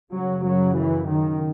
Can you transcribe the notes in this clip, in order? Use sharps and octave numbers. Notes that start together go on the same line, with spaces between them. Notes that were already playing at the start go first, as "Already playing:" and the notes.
F#2 C#3 F#3
F#3
E3
D#3